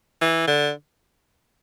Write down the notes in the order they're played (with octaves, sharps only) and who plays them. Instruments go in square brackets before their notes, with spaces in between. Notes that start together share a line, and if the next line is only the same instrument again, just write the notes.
[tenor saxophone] E3
D3